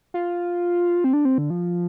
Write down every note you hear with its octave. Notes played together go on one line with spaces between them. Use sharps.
F4
C4
D4
C4
D3
F3